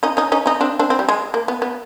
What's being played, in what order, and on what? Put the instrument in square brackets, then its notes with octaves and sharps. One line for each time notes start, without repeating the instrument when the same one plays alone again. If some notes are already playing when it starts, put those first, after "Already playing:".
[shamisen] C#4 D#4
C#4 D#4
C#4 D#4
C#4 D#4
C4 D4
C4 D4
C4
G3
G#3
A#3
B3
B3